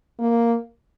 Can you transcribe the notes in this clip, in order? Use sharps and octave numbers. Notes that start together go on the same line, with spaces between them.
A#3